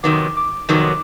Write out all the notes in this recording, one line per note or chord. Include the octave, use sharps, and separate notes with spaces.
F2 C3 D#3 F#3 B3 D6
D6
F2 C3 D#3 F#3 B3 D6